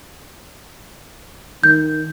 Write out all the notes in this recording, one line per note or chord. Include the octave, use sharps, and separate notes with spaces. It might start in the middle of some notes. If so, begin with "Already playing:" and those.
D#3 G6